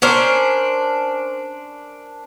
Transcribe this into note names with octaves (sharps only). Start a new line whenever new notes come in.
C#4 D4 A#4 C5